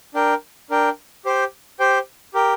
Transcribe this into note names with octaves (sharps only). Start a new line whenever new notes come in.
D4 A#4 G5
D4 A#4 G5
G4 C5 G5
G4 C5 G5
G4 A#4 G5